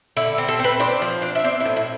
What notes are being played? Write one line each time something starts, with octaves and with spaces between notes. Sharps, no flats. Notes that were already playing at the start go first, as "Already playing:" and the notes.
D3 E4
C4
A4
C4
B4
D4 C5
F3
D4
E5
C4 D5
E4
A2
E4